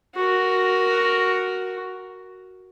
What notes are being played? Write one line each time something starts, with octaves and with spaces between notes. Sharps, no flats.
F#4 A#4